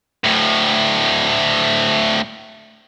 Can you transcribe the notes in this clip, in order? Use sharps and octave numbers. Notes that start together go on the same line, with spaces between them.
D2 A2